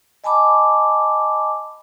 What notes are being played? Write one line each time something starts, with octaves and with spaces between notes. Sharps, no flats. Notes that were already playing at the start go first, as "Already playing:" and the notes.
D#5 G#5 A5 B5 D6